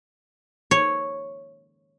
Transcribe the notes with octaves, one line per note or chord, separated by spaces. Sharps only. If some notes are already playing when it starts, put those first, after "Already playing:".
C#5